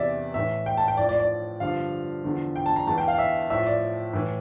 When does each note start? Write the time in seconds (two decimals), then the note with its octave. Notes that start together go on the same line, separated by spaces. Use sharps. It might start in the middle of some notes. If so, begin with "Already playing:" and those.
Already playing: E2 C3 E3 D5 E5
0.34 A2 E3 E5
0.66 G5
0.77 A5
0.88 G5
0.97 A2 F3 D5
1.09 D5
1.19 D5
1.60 G2 D3 F3 F5
2.24 E2 D3 F3
2.56 G5
2.66 A5
2.76 A#5
2.87 E2 E3 A5
2.98 G5
3.08 F5
3.18 E5
3.50 A2 F3 E5
3.66 D5
4.13 A2 E3